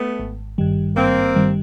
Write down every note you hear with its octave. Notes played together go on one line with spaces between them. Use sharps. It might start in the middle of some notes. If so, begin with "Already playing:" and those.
Already playing: A3 B3
G#1
G2 D#3 G3
G#1 A#3 C4
G2 D#3 G3